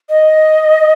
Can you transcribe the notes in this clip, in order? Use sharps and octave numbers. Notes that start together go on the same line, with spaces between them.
D#5